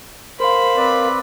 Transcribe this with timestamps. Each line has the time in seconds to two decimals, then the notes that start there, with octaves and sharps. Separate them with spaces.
0.40 A#4 C5 F5 B5
0.77 C4 B4 D5